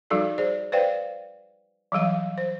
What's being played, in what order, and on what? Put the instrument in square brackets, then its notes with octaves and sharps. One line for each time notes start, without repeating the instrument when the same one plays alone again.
[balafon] F3 G3 D#4 F#4 A4 D5
G#4 C5 D5
B4 C5 D5 F5 G5
E3 F#3 G3 F5
C5